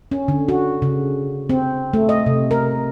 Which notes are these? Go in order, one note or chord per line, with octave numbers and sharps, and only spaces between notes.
C#4
D3
F#4
C#3
C4
A3
D#5
C3
A#4